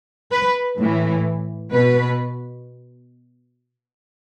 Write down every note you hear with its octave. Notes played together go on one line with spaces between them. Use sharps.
B4
A2 E3
B2 B4